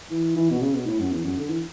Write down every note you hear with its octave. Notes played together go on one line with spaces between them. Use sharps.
E3
E3
B2
C#3
B2
A2
F#2
E2
F#2
D3
E3